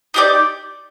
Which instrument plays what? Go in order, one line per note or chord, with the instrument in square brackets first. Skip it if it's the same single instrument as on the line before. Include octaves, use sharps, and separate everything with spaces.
[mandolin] D#4 G4 D5